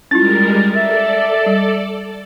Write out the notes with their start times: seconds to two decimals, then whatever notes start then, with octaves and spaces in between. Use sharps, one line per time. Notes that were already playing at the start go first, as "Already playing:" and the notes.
0.11 G3 G#3 C#4 E4 F4 A#4 A6
0.74 A4 D5 E5
1.46 G3